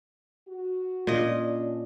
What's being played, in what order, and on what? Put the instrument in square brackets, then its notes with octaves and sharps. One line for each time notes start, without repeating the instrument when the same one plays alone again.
[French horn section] F#4
[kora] A#2 D#5 [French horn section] C#4 D4